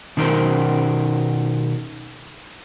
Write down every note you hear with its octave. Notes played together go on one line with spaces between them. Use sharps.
B2 D#3 D#4 A#4 C5